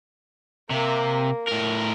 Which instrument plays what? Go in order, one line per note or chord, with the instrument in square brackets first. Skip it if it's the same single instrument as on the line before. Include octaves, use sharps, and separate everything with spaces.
[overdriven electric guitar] C3 [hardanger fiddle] A#3
[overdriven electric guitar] A2 A#4